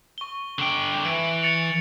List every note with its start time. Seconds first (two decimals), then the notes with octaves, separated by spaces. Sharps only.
0.18 C#6 G7
0.59 D3 G5
1.05 E3 D7
1.43 A6 C#7 F7